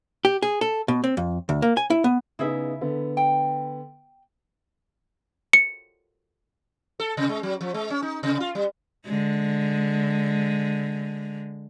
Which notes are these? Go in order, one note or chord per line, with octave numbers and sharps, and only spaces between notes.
G4
G#4
A4
B2
C4
F2
D2
A#3
G#5
E4
B3
C#3 B3 D#4 E4 G#4 E5
D3 B3
G5
C#7
A4
C3
G#3
F#3
F3
G#3
C#4
D#4
C3
F4
G3
D3 G#3